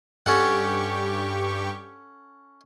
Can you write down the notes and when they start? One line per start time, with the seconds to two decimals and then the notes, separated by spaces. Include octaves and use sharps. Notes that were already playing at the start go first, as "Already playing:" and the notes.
0.26 G2 C#4 G4 A4 F#5 C#6